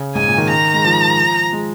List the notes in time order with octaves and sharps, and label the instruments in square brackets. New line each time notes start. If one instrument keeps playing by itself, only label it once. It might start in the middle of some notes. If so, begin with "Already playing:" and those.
Already playing: [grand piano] C#3
[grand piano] G#2 [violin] G#5
[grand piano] A#2
D#3
[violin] A#5
[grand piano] G#3
F3
G#3